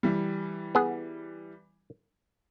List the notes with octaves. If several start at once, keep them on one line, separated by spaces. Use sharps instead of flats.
E3 G3
B3 G#4